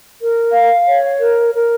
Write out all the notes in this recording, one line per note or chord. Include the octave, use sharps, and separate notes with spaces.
A#4
F5
C#5
A#4
A#4